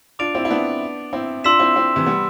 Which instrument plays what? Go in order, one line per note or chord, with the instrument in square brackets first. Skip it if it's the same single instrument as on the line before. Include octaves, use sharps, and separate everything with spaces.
[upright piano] D4 F4 [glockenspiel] D6 A6 D7 F7
[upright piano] C4 E4
E4
B3 D4
C4 E4
[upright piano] D4 F4 [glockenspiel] C6 E6 B6 E7
[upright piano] C4 E4
C4 E4
C3 E3
G3 B3